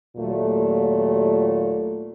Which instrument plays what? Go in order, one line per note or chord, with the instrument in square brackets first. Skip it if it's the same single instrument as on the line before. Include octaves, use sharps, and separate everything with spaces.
[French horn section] D#2 A#2 F#3 A3 F4